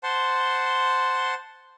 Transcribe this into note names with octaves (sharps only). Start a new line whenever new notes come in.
C5 F#5 A5 C6